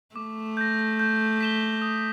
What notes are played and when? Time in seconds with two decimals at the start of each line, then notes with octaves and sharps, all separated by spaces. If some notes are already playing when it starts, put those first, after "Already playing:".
0.16 A3 D6
0.57 G6 A#6
0.99 G6
1.41 B6 E7 G7
1.82 D#6